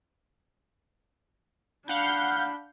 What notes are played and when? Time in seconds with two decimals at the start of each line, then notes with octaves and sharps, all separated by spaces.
1.88 D4 F5 F#5 B5 G6